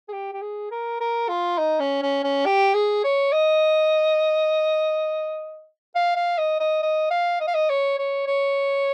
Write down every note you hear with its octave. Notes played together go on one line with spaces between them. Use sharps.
G#4
G4
G4
G#4
A#4
A#4
F4
D#4
C#4
C#4
C#4
G4
G#4
C#5
D#5
F5
F5
D#5
D#5
D#5
F5
D#5
F5
D#5
C#5
C#5
C#5